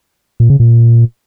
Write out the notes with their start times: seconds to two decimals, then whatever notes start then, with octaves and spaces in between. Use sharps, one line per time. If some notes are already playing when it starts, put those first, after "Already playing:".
0.40 A#2
0.50 C#3
0.60 A#2